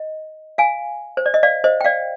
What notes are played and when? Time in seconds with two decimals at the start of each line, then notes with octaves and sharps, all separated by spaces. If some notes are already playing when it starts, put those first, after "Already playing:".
Already playing: D#5
0.58 F5 G#5
1.17 C5
1.26 D5
1.34 D#5
1.43 D5 F5
1.64 C5 D#5
1.81 G5
1.85 D5 F5